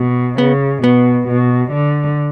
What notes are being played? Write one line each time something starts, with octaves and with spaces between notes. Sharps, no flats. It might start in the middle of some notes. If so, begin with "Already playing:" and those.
Already playing: B2
C#3 B3
B2 B3
B2
D3